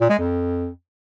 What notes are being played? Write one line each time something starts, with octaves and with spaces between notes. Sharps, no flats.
A#2
G#3
F2